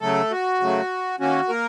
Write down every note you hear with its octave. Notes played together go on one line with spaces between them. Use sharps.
C#3 F#3 A3 A4
F#4
C#3 F#3 A3
D#3 A#3 C#4 F#4
A#3 A#4